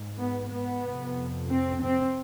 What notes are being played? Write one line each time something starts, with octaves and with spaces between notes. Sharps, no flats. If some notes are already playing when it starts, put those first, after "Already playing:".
Already playing: G#2
B3
B3
F2 C3
C4
C4